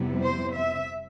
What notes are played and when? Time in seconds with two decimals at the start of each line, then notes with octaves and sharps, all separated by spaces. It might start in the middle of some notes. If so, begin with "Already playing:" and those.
Already playing: F2 C3 G3 B3 E4
0.22 C5
0.56 E5